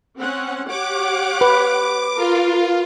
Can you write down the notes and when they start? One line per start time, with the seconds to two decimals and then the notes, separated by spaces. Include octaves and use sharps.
0.18 C4 C#4 F#5
0.68 G4 C#5 F#5 D6
1.41 B4
2.16 F4 A#4